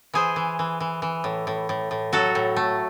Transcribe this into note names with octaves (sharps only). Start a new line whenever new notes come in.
E3 G#4 C5
E3
E3
E3
E3
A2
A2
A2
A2
F#3 F#4 A4
A2
A3